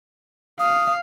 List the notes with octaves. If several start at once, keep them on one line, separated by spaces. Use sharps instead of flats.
F5 D#6